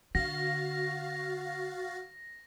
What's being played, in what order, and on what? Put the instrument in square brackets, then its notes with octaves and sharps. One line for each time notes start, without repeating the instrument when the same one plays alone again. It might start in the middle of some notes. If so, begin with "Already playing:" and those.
[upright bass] D3 [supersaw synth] F#4 F5 A6 [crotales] A#6